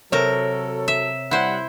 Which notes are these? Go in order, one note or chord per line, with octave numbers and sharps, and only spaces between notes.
C3 F#3 A4 A#4 C#5
E5
G3 E4 C5 F#5